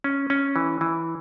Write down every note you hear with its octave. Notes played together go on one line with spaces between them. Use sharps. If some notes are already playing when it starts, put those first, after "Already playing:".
C#4
C#4
E3
E3